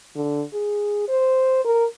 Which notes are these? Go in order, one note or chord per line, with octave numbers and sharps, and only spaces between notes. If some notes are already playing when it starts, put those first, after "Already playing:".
D3
G#4
C5
A#4